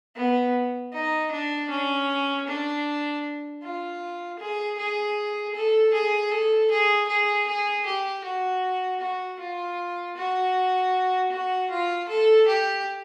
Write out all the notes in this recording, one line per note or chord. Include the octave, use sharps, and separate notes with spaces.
B3
D#4
D4
C#4
D4
F4
G#4
G#4
A4
G#4
A4
G#4
G#4
G#4
G4
F#4
F#4
F4
F#4
F#4
F4
A4
G4